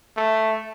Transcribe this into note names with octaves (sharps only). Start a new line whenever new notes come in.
A3